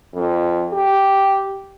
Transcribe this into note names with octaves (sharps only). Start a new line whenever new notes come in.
F2
G4